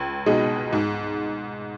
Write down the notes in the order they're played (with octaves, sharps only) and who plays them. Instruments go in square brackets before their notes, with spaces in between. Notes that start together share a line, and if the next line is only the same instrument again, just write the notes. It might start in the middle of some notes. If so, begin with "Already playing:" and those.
Already playing: [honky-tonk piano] C#2
B2 G#3 D#4
G#2